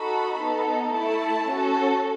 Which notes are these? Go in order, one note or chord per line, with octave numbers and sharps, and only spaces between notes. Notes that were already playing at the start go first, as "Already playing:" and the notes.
Already playing: D#4 F#4 A4 B5
B3 D#4 A4
A3 E4 A4 A5
C#4 F#4 A4